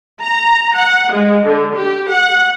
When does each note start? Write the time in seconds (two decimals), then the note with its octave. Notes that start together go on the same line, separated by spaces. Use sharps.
0.21 A#5
0.75 F#5
1.12 G#3
1.44 D3
1.75 G4
2.09 F#5